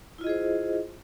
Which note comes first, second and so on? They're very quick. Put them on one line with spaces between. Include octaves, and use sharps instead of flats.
E4 F4 D#5 G#4 C5